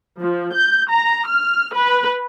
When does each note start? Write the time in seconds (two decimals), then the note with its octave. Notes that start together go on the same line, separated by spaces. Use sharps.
0.20 F3
0.53 G6
0.89 A#5
1.26 F6
1.74 B4